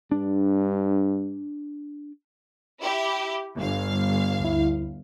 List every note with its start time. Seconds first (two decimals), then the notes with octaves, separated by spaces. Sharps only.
0.11 G2 D4
2.81 E4 G4
3.56 G1 F5
4.40 D2 E4